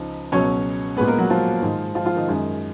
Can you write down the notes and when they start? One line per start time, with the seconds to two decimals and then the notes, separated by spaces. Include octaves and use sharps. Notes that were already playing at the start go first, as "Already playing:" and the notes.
Already playing: C#2 C#3 F3 D#4
0.32 C#2 B2 F#3 C#4 C#5
0.97 A#2 G#3 B3 B4
1.08 A#3 A#4
1.18 F#3 F#4
1.30 F3 F4
1.62 G#2 D#3 G#3
1.95 F3 F4
2.06 F3 F4
2.16 D#3 D#4
2.28 F#2 D#3 G#3